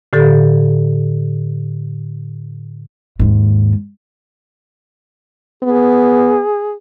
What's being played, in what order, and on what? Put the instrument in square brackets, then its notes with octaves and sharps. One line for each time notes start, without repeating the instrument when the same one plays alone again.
[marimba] A2 D3 G4 A4
[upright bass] D#2 G#2
[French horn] B3 [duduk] G#4